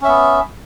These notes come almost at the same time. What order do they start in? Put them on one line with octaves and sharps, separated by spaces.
C#4 E5 B3